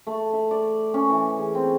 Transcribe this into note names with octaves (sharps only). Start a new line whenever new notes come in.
A3
E5
D5
C#4
E3
G#4
C4